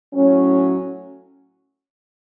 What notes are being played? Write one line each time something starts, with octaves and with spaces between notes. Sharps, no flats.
A2 F#3 C#4